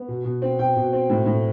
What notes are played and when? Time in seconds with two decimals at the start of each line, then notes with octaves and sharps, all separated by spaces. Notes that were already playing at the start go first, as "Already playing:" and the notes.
Already playing: B3
0.08 B2
0.25 B2
0.42 C4
0.59 B2 G5
0.76 B2
0.93 C4
1.10 A2
1.26 A2